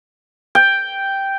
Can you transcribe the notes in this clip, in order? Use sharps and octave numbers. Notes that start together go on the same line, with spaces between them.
G5